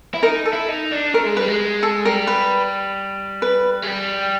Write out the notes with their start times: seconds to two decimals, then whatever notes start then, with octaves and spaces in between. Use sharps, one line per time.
0.14 E4
0.23 D#4 A#4
0.46 A4
0.53 E4
0.69 D#4
0.91 D4
1.14 A3 A#4
1.25 G#3
1.37 G3 B4
1.48 G#3
1.83 A4
2.05 G3 A#4
2.27 B4
3.42 B4
3.82 G#3
3.87 G3